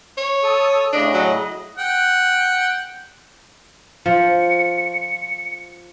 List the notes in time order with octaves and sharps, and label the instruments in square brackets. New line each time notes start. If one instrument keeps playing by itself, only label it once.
[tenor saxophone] C#5
[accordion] A4 D#6
[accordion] A2 C#3 D#5 [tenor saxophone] D4
[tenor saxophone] F#3
[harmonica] F#5 G5
[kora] F3 [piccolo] C#7